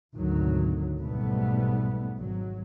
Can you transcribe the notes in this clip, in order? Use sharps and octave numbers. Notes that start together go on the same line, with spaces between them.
G#1 D2 B2 D#3 F#3
B1 G#2 G3 A3 B3
G#1 F#3